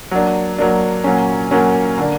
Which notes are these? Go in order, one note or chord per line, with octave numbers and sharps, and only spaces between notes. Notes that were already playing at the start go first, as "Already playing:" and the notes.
F#3 A#3 D4
F#3 A#3 D4
A#2 F#3 A#3 C#4
A#2 F#3 A#3 C#4
D3 A#3 D4